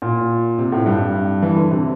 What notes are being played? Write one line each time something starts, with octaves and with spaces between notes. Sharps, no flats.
A#2
C3
A2
G2
E3
D3
C3